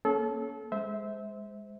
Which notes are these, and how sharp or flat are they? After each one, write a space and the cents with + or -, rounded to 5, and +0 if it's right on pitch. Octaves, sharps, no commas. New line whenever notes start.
A#3 +10 C#4 +0 A4 -30
G#3 -15 C5 -15 E5 -25